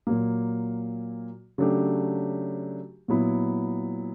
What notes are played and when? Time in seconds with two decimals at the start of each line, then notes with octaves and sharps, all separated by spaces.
0.07 A#2 F#3 A#3
1.58 C#3 F#3 A3 D4 G4
3.08 A#2 F#3 B3 E4